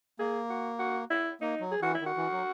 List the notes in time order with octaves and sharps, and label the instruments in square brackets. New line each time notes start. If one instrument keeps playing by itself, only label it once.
[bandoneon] A#3 [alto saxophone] G#4
[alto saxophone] F#4
F#4
E4
[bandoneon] A#3 [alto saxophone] D#4
[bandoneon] F#3
[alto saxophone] G#4
[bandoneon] E3 [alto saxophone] F#4
[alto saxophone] E4
[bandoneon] D#3
[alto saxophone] F#4
[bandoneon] E3
F#3